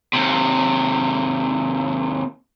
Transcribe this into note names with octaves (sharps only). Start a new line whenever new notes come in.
D#2 C3